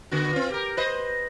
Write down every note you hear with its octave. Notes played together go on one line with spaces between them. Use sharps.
D3 B3 F#4
C4 F4
G4 A#4
B4 C5 D#5